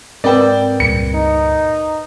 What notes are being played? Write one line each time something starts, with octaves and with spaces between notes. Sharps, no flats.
G#2 C4 A#4 B4 D5 G5
C#2 G2 A#2 C#7
D#4